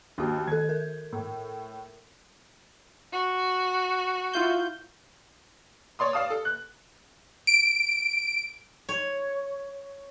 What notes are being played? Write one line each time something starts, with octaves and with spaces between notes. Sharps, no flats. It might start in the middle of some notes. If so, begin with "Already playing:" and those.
D#2 D4 F#4
D#3 A4 G#6
A#4
A2
F#4
E4 F4 G6
C#5 D5 C6 D#6
D5 F5 A5 D#6
A4
F#6
D7
C#5